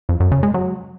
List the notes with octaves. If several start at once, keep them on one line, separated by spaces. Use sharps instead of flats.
F2
F#2
C#3
G#3
F#3